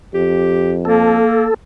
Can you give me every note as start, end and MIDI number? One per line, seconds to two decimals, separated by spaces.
0.14 1.21 41
0.14 0.76 67
0.85 1.47 58
0.85 1.54 69